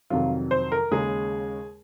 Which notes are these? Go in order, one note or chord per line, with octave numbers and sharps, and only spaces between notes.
F2 C3 D#3 F#3 F4
C5
A#4
D#2 C#3 G#3 G#4